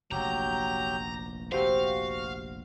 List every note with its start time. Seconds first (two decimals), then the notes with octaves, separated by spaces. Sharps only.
0.12 F1 A#1 F#3 G4 A#5 G6
1.52 F#4 G4 C5 F5